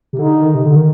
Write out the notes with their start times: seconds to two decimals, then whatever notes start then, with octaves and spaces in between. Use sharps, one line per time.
0.13 C3
0.19 D3 D#4
0.42 D#3
0.55 C3
0.66 D3
0.76 D#3